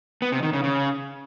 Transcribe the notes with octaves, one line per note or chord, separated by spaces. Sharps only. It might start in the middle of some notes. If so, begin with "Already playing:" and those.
B3
C3
D#3
C#3
C#3